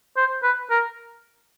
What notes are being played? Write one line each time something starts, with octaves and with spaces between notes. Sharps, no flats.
C5
B4
A#4